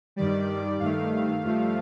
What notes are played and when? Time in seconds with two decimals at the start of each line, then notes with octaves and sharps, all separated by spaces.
0.16 G2 D#3 G3 D5
0.79 G2 D#3 A3 F5
1.43 G2 F3 A3